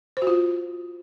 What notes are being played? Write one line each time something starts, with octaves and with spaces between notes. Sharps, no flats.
C5
F#4
F4